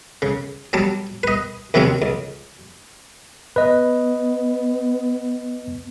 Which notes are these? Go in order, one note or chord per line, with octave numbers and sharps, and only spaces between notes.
C#3
F#3 G3 A5
B4 D#5
D#2 C3 F#3 G#3 C4 C#4
C#2
B3 B4 D#5